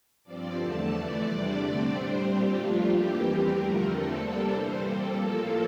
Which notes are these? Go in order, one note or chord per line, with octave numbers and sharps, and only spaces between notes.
G2 F3 C4 D5
E2 D3 A3 A5
F2 E3 A3 D5
E2 C3 G3 D4
D3 A3 C4
A2 G3 D4 C5
A#2 G3 C4 G4
G2 F3 A3 D4 F4
F2 E3 A#3 G4
E2 E3 G3 C4 G4
G2 D3 F3 A3 A#4
E2 D3 A3 C4 A4
C3 G3 A#3 D4 A4
G2 E3 G3 C5
A#2 G3 C4 A4
A2 F3 A#3